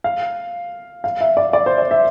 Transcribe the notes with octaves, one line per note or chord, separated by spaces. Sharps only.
F5
F5
E5
D5
D5
C5
D5
E5